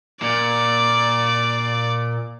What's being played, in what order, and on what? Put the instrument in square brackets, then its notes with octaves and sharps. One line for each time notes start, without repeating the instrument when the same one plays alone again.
[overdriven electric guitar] A#2 [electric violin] D5